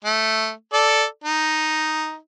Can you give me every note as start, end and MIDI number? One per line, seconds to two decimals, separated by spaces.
0.05 0.51 57
0.73 1.04 69
0.73 1.04 74
1.24 2.16 63